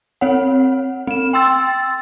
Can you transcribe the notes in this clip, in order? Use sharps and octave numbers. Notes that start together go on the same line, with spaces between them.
C4 C#5 F#5
C4 E7
G5 C6 E6 A6